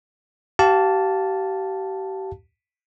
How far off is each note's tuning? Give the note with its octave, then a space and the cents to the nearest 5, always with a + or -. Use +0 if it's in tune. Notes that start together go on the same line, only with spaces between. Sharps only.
G4 -35 F5 +0 A5 +0